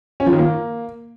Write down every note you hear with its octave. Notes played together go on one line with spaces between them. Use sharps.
C#4
F3
D#3
A#3